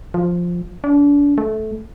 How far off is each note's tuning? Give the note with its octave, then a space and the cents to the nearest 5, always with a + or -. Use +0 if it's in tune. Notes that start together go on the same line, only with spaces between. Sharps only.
F3 +5
D4 -35
A3 -15